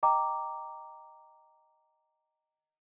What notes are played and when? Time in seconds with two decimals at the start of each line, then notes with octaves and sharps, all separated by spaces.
0.03 D#5 G5 A#5 D6